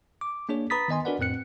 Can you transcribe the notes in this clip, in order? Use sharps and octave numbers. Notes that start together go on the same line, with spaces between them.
D6
A#3 D4 G#4 C#5
B4 A#5 B5 D#6 A6 B6
D#3 B3 D#5 G#5 C6
D4 F#4 A#4 B4 D5 F#5
F2 A2 C4 F#6 C#7